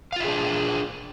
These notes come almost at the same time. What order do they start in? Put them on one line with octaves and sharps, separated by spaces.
F5 F4 E5 G#4 D4